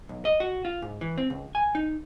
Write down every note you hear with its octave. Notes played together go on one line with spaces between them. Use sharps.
B1
D#5
F#4
F4
G#2
E3
C4
C#2
G#5
D#4